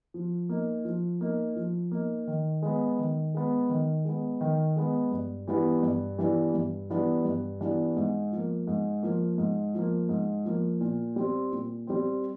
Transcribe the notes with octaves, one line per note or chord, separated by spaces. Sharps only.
F3
A#3 D#4
F3
A#3 D#4
F3
A#3 D#4
D#3
G#3 B3
D#3
G#3 B3
D#3
G#3 B3
D#3
G#3 B3
G2
E3 G3 B3 D4
G2
E3 G3 B3 D4
G2
E3 G3 B3 D4
G2
E3 G3 B3 D4
G#2
F3 A#3
G#2
F3 A#3
G#2
F3 A#3
G#2
F3 A#3
A#2
G3 C4
A#2
G3 C4